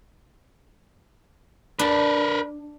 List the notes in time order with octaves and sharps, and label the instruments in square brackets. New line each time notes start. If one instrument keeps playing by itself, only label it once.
[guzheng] D4 [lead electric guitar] A#4 B4